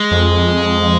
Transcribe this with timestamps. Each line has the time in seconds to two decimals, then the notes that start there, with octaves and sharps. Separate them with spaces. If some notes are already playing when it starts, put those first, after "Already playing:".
Already playing: G#3
0.11 F2